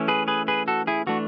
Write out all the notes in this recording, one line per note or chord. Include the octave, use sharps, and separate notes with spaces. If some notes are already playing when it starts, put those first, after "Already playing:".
Already playing: E3 A3 C#4
G#4 B4
G#4 B4
G#4 B4
F#4 A4
E4 G#4
E3 A3 D4 F#4